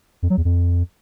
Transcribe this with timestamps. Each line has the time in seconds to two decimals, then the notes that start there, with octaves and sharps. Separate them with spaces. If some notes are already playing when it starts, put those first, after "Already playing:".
0.23 F2
0.30 F#3
0.37 E2
0.45 F2